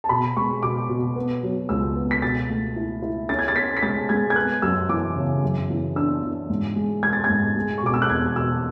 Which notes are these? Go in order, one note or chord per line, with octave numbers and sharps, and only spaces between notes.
A5
B2 B5
G#3 C#6
B2 D6
B2
B3
F#3
C#2 E6
B3
B6
B2 A6
A3
E4
E4
C#4 A6
G#6
A6
C#4 B6
B6
G#3 A6
G#3 G#6
G#6
B3 F#6
F#2 E6
E3 D6
C#3
F#2
E3
D4 E6
E3
G#2
G#3
G#3 G#6
A6
G#6
G#2
G#3
C#6
B2 D6
E6
F#6
E2 G#6
B2 E6